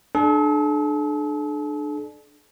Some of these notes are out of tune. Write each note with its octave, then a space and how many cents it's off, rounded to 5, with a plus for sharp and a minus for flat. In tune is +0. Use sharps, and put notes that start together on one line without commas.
D4 +25 A4 -45